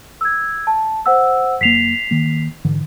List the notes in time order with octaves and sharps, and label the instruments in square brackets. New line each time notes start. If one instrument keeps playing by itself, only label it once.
[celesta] E6 G#6
A5
C5 F#5 E6
[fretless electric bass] F#1 A#3 [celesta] B6 C7 F7
[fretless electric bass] D#3 A#3
G#2 D3 E3